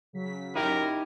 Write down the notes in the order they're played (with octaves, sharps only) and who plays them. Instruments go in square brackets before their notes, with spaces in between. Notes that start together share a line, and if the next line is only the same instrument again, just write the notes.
[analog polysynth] C#3 F#3 B6
[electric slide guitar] D#4 E4 G4 [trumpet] A#4